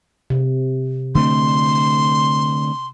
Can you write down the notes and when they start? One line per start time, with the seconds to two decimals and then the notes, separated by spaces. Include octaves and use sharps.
0.30 C3
1.15 D3 A3 C4 C6